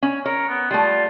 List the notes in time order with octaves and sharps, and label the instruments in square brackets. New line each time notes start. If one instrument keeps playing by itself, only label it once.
[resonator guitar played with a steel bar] C#4
[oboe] A#4 [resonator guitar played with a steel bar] C#5
[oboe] B3
[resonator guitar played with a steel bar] G3 A3 [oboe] F4